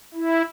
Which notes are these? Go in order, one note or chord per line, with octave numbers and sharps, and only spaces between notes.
E4